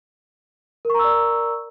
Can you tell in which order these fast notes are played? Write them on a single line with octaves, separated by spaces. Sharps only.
A#4 C#6 A#5 E6 D5